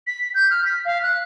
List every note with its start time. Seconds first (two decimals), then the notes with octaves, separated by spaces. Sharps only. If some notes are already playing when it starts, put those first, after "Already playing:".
0.07 B6
0.34 G6
0.50 F6
0.65 B6
0.85 F5
1.03 F#6